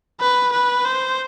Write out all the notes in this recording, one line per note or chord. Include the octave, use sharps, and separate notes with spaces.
B4
B4
C5